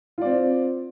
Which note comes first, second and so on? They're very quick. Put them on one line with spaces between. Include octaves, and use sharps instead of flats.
F4 D5 C4